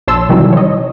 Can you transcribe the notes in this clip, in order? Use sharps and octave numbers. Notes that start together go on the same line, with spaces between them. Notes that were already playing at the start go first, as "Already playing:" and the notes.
A#1 C#5 A5 C6 E6
C3 D#3 E3 F#3 G3
C#5 D#5